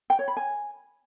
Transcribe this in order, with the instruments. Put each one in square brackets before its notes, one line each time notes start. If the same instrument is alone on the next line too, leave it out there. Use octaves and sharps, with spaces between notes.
[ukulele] G5
C#5
B5
G#5